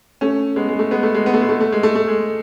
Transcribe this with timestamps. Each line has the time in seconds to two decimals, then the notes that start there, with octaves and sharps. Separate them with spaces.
0.21 A3 C#4
0.56 G#3 B3
0.69 G#3
0.79 A3
0.91 G#3 B3
1.03 A3
1.14 G#3
1.26 B3
1.34 A3
1.41 G#3
1.49 A3
1.61 A3
1.72 G#3
1.83 A3
1.95 A3
2.08 G#3